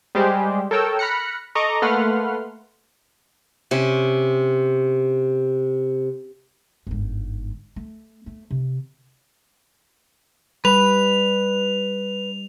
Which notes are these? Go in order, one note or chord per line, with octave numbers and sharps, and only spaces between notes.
G3 G#3 G4 G#4 C5
A4 A#4 C#5 G5 E6
B5 F6 F#6 A#6 C#7
A4 D#5 A#5 C#6 D6
A3 A#3 B4 F#5 C6 F6
C3 C#4 C5
G1 G#2
A3
A3
C3
G3 B4 F7